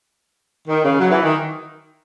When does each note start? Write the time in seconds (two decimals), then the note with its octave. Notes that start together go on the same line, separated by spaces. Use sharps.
0.68 D#3
0.84 C#3
0.99 F#3
1.11 E3
1.24 D#3